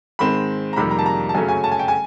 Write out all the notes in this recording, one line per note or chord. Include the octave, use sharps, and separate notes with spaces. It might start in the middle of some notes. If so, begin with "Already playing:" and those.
G#2 D#3 G#3 C4 B5
A#5
F2 C3 D#3 G3 A#3 B5
A#5
A5
A#5
A5
F#2 C#3 F#3 A3 C#4 G#5
G#5
A5
G#5
G5
G#5